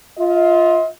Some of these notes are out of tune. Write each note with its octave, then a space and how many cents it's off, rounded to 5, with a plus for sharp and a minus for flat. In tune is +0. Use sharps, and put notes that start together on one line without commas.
F4 +0 D#5 +45